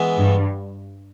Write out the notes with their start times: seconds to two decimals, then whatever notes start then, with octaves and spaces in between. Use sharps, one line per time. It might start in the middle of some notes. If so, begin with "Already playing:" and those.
Already playing: E3 G#3 B3 E4
0.17 G2